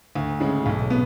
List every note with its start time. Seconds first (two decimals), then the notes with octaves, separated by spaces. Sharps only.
0.15 D2
0.40 C#3 G#3
0.66 B1
0.90 B3